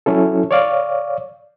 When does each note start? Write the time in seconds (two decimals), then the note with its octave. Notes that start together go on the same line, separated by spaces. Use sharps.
0.06 F#3 C#4 E4 A4
0.51 C#5 D5 F5